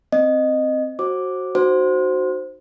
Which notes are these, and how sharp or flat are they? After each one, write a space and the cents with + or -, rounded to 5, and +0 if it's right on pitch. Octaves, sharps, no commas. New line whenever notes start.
C4 +0 D#5 -15
F#4 +0 C5 +30 D6 +0
D#4 -25 F#4 +0 C5 +0